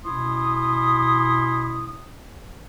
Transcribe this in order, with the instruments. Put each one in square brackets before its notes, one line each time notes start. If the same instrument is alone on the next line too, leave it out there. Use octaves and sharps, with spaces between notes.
[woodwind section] B2 C#4 E4 C6 D#6